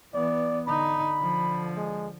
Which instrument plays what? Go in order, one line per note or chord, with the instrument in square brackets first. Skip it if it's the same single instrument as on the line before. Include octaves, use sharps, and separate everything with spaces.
[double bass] E3 B3 [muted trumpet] D5
[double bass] D3 D#4 [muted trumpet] B5
[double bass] D3 F3
[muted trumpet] G#3